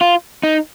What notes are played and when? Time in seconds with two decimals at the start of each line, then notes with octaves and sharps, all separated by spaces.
0.01 F4
0.43 D#4